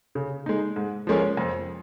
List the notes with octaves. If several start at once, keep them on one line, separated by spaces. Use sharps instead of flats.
C#3
G#3 D#4
G#2
F3 G#3 C#4 A#4
F2